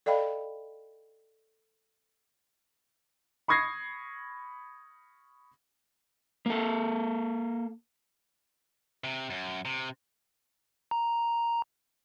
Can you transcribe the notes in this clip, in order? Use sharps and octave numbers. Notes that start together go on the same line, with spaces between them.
A4 D5 D#5 F5 G5 B5
B5 C#6 D#6 G#6 A#6 C7
A#3 A4
C3
F#2
C3
A#5